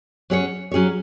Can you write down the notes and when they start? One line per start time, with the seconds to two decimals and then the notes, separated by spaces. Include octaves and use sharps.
0.30 F#3 C#4 G#4 C#5
0.72 F#3 C#4 G#4 C#5